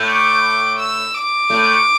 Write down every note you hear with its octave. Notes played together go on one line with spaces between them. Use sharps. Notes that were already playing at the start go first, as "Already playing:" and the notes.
Already playing: A2 A3
D6
E6
D6
A2 A3